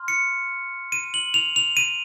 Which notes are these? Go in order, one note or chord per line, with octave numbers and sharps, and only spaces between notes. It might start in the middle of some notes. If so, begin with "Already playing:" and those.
Already playing: C6 F6
C#7
D#7
F#7
F7
F7
D#7